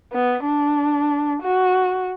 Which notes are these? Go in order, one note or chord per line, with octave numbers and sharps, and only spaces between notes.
B3
D4
F#4